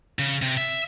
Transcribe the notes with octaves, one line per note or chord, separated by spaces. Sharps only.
C#3
C3
E5